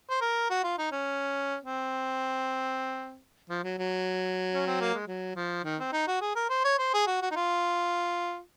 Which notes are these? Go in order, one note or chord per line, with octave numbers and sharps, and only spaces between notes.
C5
A#4
F#4
F4
D#4
C#4
C4
F3
F#3
F#3
C#4
C4
A#3
G#3
F#3
F3
D#3
C4
D#4
F#4
G#4
A#4
C5
C#5
C5
G#4
F#4
F#4
D#4
F4